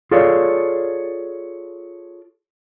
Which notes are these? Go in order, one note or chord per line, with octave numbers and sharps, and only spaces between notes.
F4 G#4 A4 C#5 D5 F5